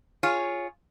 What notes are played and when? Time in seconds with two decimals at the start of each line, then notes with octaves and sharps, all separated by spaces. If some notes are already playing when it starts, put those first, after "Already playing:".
0.23 F4 G#4 C#5